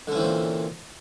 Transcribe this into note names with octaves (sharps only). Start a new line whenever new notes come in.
A#2 D3 E3 C4 C#4